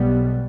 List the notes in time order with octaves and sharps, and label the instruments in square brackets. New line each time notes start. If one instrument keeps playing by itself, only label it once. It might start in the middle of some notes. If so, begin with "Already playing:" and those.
Already playing: [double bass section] B1 B2 G3 B3